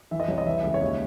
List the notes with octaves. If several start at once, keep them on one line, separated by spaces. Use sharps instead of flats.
E3 E5
D#5
C2 C#5
D#5
E3 E5
C#2 E5
C#5
D#2 D#5